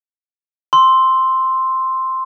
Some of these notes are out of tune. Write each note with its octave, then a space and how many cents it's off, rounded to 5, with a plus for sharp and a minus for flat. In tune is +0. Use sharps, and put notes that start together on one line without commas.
C6 +0 E6 -10